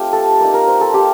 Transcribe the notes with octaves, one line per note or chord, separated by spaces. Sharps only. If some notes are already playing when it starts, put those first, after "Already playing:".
Already playing: A3 C4 F4 G4
A4
A#3 D#4
A#4
C5
A4
A#3 F4 G4